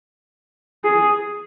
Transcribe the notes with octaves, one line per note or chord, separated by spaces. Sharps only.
G#4